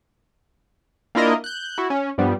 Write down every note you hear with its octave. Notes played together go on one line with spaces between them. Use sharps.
A#3 D4 E4 F4 A#4 D#5
F#6 G6
E4 F#4
C#4
G2 F3 G3 B3